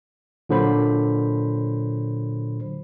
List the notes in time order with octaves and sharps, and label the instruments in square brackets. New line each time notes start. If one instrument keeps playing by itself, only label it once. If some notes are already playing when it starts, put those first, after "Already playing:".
[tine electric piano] A#2 D3 F#3 C5 B5